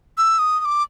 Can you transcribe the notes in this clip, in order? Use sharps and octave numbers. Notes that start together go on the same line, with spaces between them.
E6
D#6
D#6
D6